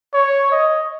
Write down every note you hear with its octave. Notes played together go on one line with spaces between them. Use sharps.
C#5
D#5